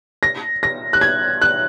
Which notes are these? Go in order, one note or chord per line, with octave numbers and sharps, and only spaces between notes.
A#6
A#6
F#6
G#6
F#6